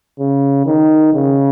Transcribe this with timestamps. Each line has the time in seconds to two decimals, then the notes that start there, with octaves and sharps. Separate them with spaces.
0.19 C#3
0.66 D#3
1.14 C#3